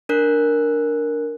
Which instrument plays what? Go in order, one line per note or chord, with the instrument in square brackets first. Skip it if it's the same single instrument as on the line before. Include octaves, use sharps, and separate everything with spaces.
[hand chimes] D4 A#4 F#6